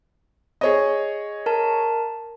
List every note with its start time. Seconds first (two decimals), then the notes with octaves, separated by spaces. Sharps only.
0.61 G#4 C#5 D#5
1.46 A#4 A5